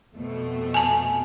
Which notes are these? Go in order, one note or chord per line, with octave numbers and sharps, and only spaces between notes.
F2 B2 A3
G#5 A5